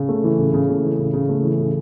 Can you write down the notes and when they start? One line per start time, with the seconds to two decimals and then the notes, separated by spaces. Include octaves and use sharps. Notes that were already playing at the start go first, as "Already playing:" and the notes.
Already playing: C#3
0.09 A3
0.24 E3
0.39 C#3
0.54 C#3
0.69 A3
0.84 E3
0.99 C#3
1.13 C#3
1.29 A3
1.44 E3
1.59 C#3